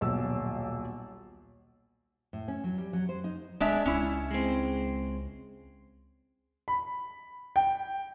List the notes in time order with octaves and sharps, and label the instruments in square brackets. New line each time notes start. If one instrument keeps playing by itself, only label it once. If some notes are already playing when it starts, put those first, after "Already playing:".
[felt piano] D#1 B1 E6
[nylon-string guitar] A2
C#4
F#3
G3
F#3
C5
D#4
[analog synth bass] D1 [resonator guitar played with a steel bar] G#3 D4 E5
[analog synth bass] C#2 [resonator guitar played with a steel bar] C#4 E4
[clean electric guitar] G#3 C4
[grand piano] B5
G5